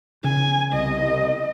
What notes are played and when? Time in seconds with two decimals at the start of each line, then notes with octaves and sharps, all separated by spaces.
0.24 C#3 G#5
0.73 C2 D#5